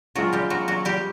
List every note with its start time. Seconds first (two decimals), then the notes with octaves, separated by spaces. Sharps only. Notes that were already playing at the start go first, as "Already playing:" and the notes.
0.15 F3 F#3 G#3 C4 F4 F#4
0.33 G3 G4
0.50 F#3 F#4
0.68 F#3 F#4
0.85 G3 G4